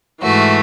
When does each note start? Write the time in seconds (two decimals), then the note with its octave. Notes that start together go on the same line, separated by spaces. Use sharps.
0.23 G#2 E3 A3 F#4